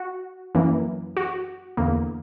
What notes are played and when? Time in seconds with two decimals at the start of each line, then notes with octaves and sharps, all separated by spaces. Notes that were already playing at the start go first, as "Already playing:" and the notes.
Already playing: F#4
0.55 F#2 E3 A#3
1.17 F#4
1.77 E2 D3 A#3